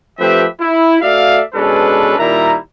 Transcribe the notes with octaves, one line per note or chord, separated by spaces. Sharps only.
F3 A3 C4 G4 B4 E5
E4
A3 F#4 D5 E5 F5
B2 G#3 C#4 D4 A4 B4
A#2 D#3 G3 E4 E5 A#5